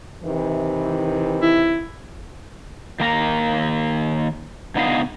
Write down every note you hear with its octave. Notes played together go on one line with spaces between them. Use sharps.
C3 D#3 E3
E4
D#3 A#3 A#4
B2 D3 B3 D#4 D#5 F5